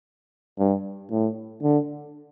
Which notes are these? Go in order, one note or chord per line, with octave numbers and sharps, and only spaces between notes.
G2
A2
D3